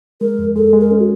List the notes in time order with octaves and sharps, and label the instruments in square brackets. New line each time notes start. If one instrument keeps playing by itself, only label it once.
[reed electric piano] G#3 [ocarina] A#4
[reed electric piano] F2
[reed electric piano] G#3 [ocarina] A4
[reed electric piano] G#3
[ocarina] A#4
[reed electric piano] C#4 [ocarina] A4
[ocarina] F#4